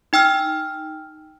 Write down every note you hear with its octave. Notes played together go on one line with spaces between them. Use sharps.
D#4 G5 E6 F6